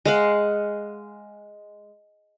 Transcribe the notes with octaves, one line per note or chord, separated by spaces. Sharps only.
G#3 F5 F#5